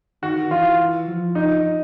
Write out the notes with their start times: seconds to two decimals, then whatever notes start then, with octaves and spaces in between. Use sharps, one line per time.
0.23 D#3 F#4
0.51 E3 F4
1.08 F3
1.35 D#4